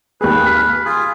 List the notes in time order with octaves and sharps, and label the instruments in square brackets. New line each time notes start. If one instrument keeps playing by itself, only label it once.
[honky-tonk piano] D#2 G#4 [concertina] B4
[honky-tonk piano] F6 B6 C7
[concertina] F4 G#4